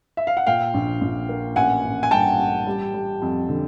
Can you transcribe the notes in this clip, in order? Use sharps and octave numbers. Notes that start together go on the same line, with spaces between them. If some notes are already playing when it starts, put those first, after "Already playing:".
E5
F5
F#5
A#2 F5 G5
A#1
A#1
A#3
A1 F#5 G#5
A1
G#5
G2 G5 A5
A1
G3
G3
F2
D3